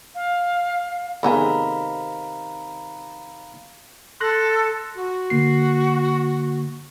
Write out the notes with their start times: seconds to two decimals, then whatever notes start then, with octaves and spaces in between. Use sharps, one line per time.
0.15 F5
1.23 C3 D#3 A3 B3 G#4 F5 A#5 B5
4.20 A4 C6 F#6 A#6
4.95 F#4
5.30 D3 A#3 C7